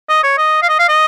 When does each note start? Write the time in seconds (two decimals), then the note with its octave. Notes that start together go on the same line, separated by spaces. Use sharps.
0.09 D#5
0.24 C#5
0.38 D#5
0.63 F5
0.69 D#5
0.79 F5
0.89 D#5